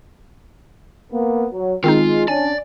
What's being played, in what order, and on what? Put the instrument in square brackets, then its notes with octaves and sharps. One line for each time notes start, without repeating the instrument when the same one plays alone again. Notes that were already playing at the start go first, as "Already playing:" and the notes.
[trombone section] A#3 B3
F#3
[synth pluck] D#3 C4 D#4 [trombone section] G#3 [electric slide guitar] F4
[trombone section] C#4 D4 [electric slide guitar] D5 [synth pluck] G#5